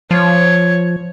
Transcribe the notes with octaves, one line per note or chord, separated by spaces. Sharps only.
F3 C#5